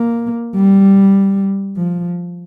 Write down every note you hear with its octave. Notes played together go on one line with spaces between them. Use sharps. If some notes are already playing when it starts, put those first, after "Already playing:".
Already playing: A#3
G3
F3